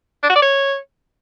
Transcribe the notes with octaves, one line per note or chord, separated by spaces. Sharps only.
D4
F#4
D5
C#5